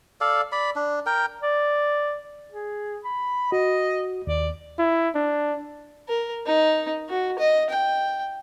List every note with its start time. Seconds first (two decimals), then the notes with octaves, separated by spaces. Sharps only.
0.21 A4 D5 F5
0.52 D5 B5
0.76 D4
1.06 A#4 G5
1.43 D5
2.51 G#4
3.04 B5
3.52 F#4 D#5
4.27 D#2 D5
4.79 E4
5.15 D4
6.08 A#4
6.46 D#4
7.09 F#4
7.39 D#5
7.70 G5